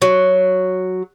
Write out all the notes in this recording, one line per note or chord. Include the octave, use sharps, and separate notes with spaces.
F#3